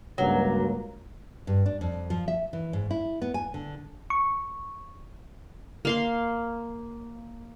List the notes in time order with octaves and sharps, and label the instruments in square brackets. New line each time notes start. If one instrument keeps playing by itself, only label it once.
[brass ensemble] C#2 G2 A#3 [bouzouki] F#3
[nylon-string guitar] G2
D4
F2
F3
E5
E3
G#2
E4
B3
G#5
D3
[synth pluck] C#6
[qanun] A#3 F5 C6